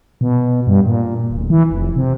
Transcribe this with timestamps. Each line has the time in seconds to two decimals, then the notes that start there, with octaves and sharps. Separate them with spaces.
0.21 B2
0.67 G2
0.86 A#2
1.30 D1
1.50 E3
1.71 F1
1.96 C3